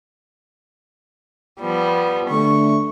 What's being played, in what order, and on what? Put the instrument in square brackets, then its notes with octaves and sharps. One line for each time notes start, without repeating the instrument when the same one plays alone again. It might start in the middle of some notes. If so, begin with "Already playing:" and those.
[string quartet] F3 G3 B3
[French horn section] D3 A3 [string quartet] C#6